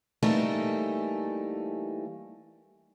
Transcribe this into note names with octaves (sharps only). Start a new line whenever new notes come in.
E3 G3 A3 A#3 D#4 A4